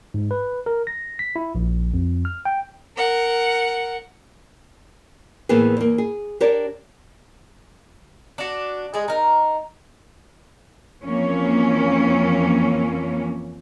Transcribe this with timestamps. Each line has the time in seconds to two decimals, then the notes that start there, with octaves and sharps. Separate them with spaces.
0.14 G#2
0.31 B4
0.66 A#4
0.87 A#6
1.19 B6
1.36 E4
1.55 A#1
1.94 F2
2.25 F6
2.45 G5
2.96 A#4 F#5
5.49 A2 E3 A#3 B3 G#4
5.77 E2 A#3
5.98 G#4
6.40 D4 G4 A#4 C#5 D5
8.38 D4 F#4
8.94 G#3 G#4
9.08 D#4 A#4
11.05 F2 E3 A#3 C#4